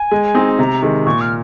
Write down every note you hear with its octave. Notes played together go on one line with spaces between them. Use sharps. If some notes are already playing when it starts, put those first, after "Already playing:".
Already playing: G#5
G#3
C4 D#4 G#4
C3 A#5
D#3 G#3
A#2 C#6
F6